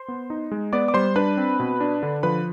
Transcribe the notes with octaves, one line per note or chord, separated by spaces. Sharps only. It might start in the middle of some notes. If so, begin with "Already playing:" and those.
Already playing: C5 C6
B3
D#4
G#3
B3 D5 D6
D6
G3 C5 C6
D4 B4 B5
C4
B2
D4
D3
F3 B4 B5